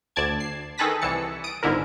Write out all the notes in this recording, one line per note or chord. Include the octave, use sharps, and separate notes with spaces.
D2 D5 A5 G#6
C7
D#3 G#4 A4 B4 A#6 B6
C2 E3 A5 C#7
D#6 D7
G1 G#2 D3 E4 A#4